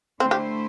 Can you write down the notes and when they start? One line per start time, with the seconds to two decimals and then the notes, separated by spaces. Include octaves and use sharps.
0.20 D3 A3 C4 E4 C5
0.31 G4